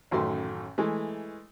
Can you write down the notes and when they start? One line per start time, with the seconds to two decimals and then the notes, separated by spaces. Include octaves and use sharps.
0.11 A1 F#2 D#3 A3 C6
0.78 E3 G#3 A3